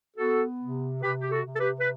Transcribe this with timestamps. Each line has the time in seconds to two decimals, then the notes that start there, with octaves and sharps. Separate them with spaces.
0.17 B3 F#4 A4
0.61 C3
1.03 C3 G4 B4
1.21 G4
1.32 F#4 A4
1.45 C3
1.55 A4
1.60 G4 B4
1.80 B4